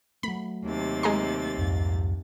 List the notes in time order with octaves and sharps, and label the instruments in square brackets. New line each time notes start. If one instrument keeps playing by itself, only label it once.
[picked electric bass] F#3 A3 [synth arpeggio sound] B5
[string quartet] D#2 C3 A6
[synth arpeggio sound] G#3 A#5 C6
[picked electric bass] C2 F2 G#2